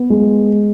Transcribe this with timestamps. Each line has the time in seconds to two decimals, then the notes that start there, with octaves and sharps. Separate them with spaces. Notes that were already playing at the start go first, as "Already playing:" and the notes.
Already playing: B3
0.10 G#3